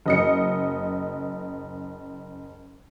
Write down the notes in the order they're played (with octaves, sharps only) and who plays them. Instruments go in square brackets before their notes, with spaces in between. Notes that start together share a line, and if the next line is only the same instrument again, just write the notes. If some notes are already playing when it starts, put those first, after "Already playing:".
[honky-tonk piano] F#1 D#5 C#7